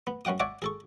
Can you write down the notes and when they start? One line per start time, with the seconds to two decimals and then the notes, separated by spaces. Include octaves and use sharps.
0.07 B3
0.25 F#2 C#4 F#5 G5 D#6
0.40 C#5 D5 E5 F#5 G#5 D6
0.62 G#4 A4 C#6